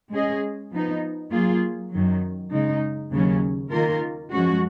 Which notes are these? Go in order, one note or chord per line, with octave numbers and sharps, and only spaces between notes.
G#3 C#4 G#4 D#5
F3 B3 D#4
F#3 A#3 F4 G#4
F#2 D#3 F#3
C#3 G#3 D#4
D#2 C#3 F#3 C#4
D#3 A#3 F4 A#4
F#2 F3 G#3 C#4 F#4